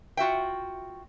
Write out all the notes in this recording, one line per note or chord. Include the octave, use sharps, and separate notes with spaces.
F4 F#4 E5 G5